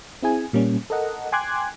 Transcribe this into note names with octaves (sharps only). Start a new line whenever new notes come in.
C4 E4 G#4 G#5
A#2 G3 A#3 C#4
A4 A#4 D#5 F#5
G5 G#5 C6 D6 F#6 G#6